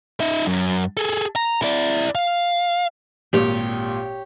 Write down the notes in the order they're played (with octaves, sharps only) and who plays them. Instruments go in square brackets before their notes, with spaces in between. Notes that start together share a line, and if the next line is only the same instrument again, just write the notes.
[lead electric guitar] D#4 E5
F#2
G#4 A4
A#5
E4 D5
F5
[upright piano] G#1 A#2 [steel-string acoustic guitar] G4 C#5